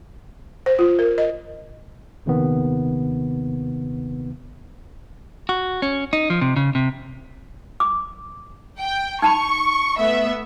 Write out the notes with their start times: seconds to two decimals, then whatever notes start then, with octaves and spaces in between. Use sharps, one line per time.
0.66 C5
0.79 F4
0.99 A#4
1.18 D#5
2.26 A#1 D#2 C3 D#3 B3
5.49 F#4
5.82 C#4
6.13 D#4
6.30 F3
6.41 C3
6.56 C#3
6.75 C3
7.80 D6
8.79 G5
9.22 D#4 A5 B5 C#6
9.98 A3 B3 E5